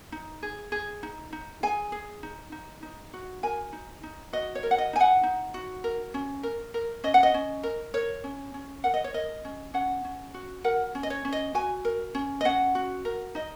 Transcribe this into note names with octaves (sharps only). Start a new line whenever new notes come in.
D#4
G#4
G#4
D#4
D#4
G#4 G#5
G#4
D#4
D#4
D#4
F#4
A#4 G#5
D#4
D#4
F#4 D#5
C#5
A#4
F#5
D#5
D#4 G#5
F#5
D#4
F#4
A#4
C#4
A#4
A#4
C#4 D#5
F#5
D#5
C#4
A#4
A#4 C#5
C#4
C#4
A#4 F#5
D#5
C#5
A#4 D#5
C#4
C#4 F#5
C#4
F#4
A#4 F#5
C#4
D#5
C#5
C#4
D#5
F#4 G#5
A#4
C#4
D#5
C#4 F#5
F#4
A#4
D#4 D#5